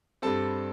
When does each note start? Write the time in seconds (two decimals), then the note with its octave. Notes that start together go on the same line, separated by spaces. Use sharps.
0.22 G2 G3 C4 A4 A5